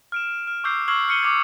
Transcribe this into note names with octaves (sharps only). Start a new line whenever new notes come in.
F6 D7 E7
F6
C#6 D6 E6 G6 C7
C#6 E6 F6 G#6 C7 F#7
F6 C7 C#7 D#7 G7
D6 G#6